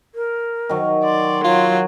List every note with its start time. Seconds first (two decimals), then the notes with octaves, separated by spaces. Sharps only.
0.15 A#4
0.69 D#3 F#3
1.04 D5 C6
1.45 F#3 F4